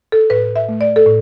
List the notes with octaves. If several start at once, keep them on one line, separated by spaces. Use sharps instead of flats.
A4
A2 B4
E5
A3
D5
A4
A2